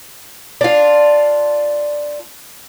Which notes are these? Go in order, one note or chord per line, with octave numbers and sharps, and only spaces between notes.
D4 F4